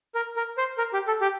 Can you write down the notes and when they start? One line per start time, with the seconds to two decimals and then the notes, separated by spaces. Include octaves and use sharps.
0.15 A#4
0.36 A#4
0.58 C5
0.78 A#4
0.93 G4
1.07 A4
1.21 G4